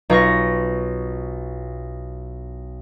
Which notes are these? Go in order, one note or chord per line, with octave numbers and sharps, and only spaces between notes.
B1 F4 C#6 A#6